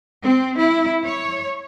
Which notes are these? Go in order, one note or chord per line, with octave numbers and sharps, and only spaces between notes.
C4
E4
C#5